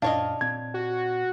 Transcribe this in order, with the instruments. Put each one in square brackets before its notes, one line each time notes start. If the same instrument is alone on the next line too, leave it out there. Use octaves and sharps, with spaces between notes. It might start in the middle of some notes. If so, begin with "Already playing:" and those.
[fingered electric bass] F#2 A#2 [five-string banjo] D4 C#5 D#5 [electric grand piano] F5
[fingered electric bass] A#2 C4 [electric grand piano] G#6
[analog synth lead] F#4